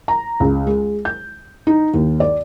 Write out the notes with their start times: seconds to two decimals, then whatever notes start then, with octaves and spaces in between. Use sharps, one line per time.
0.08 A#5
0.40 C#2
0.67 G#3
1.05 G6
1.67 D#4
1.94 D#2
2.20 D5